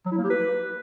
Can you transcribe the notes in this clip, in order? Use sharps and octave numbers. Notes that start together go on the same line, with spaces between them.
F#3
E4
A#3
G4
B4